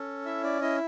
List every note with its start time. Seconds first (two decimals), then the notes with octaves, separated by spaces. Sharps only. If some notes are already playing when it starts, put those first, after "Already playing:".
Already playing: C#4 A4
0.26 E4 E5
0.44 D5
0.62 E4 D#5